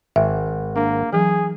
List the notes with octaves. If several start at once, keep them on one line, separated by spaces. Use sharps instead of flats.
G#1 E5
A#3 D4
E3 F#3 G#4